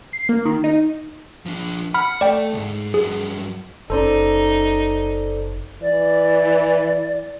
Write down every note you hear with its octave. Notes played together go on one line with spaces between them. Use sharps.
C7
A#3
D#3
D#4
F3 D4
F#5 B5 F6
A3 D5 G5
C2 G#2
G2 F#3 G#4
F#1 C#4 D#4 A4 C5 D5
E3 D5